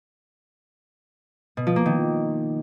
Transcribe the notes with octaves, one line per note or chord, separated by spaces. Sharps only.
B2
F3
A#3
D#3